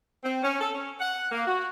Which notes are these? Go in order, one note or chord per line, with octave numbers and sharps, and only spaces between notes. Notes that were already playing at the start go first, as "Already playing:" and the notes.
C4
C#4
A4
C#4
F#5
A#3
F#4